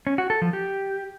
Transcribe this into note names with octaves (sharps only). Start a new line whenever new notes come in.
C#4
F#4
A4
F3
G4